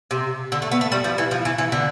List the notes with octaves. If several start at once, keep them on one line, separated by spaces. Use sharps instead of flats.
C3
D3
A3
B3
A3
G3
F3
E3
F3
E3
E3
D3